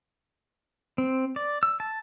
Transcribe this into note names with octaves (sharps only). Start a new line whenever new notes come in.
C4
D5
E6
A5